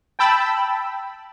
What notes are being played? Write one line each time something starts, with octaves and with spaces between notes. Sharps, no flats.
G5 A5 B5 E6